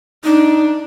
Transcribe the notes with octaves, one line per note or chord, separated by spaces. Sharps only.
D4 D#4